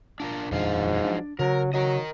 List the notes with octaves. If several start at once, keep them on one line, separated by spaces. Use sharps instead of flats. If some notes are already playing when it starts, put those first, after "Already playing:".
D4 F4 A#4
D#1 F2 G#2 F3 F#3 D4 F5
D4
C#3 F#3 A#4
F#3 A#4 D#5